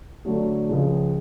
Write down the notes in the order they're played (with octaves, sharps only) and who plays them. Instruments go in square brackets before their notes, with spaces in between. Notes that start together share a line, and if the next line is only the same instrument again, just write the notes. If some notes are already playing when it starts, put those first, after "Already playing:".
[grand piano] D3 F#3 A3
C#2 C#3 F3